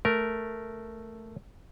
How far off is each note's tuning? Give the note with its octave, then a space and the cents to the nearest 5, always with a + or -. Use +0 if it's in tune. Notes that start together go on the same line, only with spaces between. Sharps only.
A3 +0 A#4 +0